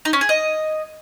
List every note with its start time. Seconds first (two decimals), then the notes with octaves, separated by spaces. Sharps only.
0.05 D#4
0.13 C#4
0.21 G#4
0.29 D#5